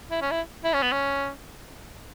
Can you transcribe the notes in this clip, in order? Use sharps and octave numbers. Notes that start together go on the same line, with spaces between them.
E4
C#4
E4
E4
C#4
B3
C#4